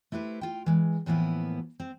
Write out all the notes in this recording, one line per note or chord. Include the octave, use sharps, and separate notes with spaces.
A3 E4 G4 B4 C5
F4 G5
E3 G#3
A2 E3 F3 A#3 B3 E4
C4